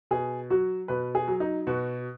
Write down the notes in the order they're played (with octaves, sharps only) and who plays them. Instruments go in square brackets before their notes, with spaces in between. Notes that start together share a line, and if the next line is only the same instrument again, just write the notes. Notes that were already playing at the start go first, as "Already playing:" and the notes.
[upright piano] B2 G#4
F#3 F#4
B2 B4
G#4
F#3
D#4
B2 F#4